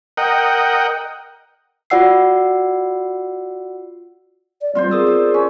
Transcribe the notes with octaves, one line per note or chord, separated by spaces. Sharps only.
A#4 D#5 F#5 G5
F4 F#4 D5 F#5 E6 C7
D5
G3 B3 C4 F4 C5 D5
G#4 A#4 D#6 E6
D5
C#4